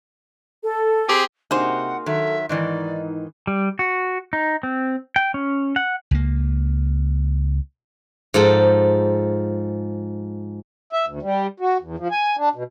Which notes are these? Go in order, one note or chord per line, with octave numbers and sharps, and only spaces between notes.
A4
C4 G4 G#4
C3 A#3 D#4 F#4 G#4 C5 F#5
D#3 F#3 A4 E5
G#2 D#3 E3 D#4 D5
G3
F#4
D#4
C4
G5
C#4
F#5
C#2 A#3
G#2 F3 A4
E5
D2
G3
F#4
E2
F3
G#5
D4
B2